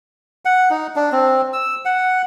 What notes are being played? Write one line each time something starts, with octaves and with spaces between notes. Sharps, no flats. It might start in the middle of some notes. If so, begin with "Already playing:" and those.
F#5
D#4
D4
C4
E6
F#5